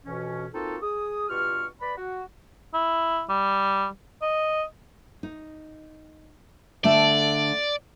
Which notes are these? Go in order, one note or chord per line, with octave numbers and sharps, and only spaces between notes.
F2 B2 E3 C#4
A#3 C4 D#4 F4 F#4 A4
G#4 D#6
G2 B2 F4 G4 C#6 F6
B4 D5 B5
F#4
E4
G3
D#5
D#4
D3 A3 D5 A5